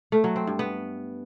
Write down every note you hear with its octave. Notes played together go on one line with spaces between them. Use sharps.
A3
F#3
C4
G2
B3